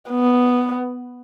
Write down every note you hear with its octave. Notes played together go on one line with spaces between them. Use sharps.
B3